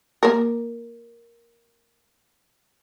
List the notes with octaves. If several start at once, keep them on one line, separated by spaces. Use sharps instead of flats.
A#3 A#4